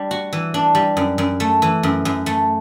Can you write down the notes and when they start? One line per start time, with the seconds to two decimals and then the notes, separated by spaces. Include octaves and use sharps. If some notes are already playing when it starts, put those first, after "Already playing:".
Already playing: G3 D4
0.11 F#4
0.33 E3
0.54 D4
0.75 G3
0.97 F#2
1.18 F#2
1.40 A3
1.62 E3
1.83 F#2
2.05 F#2
2.26 A3